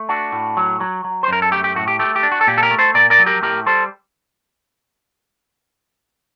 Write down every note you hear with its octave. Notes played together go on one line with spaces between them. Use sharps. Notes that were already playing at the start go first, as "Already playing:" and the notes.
Already playing: A3
D4 F#4
A2
F#3
F#3
F#3
C5
F#2 A#4
A4
A3 G4
G4
A2 F#4
G4
A3 G4
G4
D4
F#4
A4
A#2 G4
A4
G4 A#4
A3
A4 C5
A#2 A#4 D5
A#4 D5
F#3
G4 A#4
A2 G4 A#4
G3 A4 C5